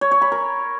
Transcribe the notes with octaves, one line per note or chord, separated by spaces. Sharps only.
C#5
C#5
B5
A#4